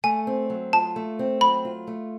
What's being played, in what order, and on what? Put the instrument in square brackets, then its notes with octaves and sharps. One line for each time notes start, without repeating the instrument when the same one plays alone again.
[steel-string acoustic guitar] A3 [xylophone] G#5
[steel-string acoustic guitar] C4
F#3
[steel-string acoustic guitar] F4 [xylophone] A5
[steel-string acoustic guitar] A3
C4
[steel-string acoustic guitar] F#3 [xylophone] B5
[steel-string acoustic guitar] F4
A3